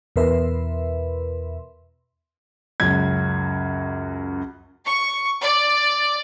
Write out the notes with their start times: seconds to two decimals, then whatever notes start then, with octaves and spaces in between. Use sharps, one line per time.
0.16 E2 B2 A#4 B4 E5 C6
2.80 C#2 F#2 G#6
4.86 C#6
5.42 D5